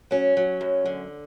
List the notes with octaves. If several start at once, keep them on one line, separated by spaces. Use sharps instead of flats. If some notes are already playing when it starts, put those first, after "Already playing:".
F#3 C#4
F#3
F#2
D3